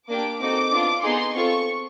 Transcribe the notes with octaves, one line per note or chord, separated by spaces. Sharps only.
A#3 D4 G4 D6
C4 D#4 F#4 A4 D6
B3 D4 F4
B3 D#4 G#4 C6
C4 F4 A4 C#6